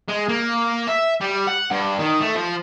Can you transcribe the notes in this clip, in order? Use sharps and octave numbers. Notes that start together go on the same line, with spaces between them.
G#3
A#3
E5
G3
F#5
G2
D#3
A3
F3